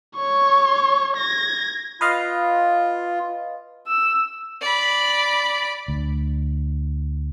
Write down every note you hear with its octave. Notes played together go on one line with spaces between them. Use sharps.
C#5 C#6
G#6 A#6
F4 B4 D#5 F5
E6
D5 B5
D2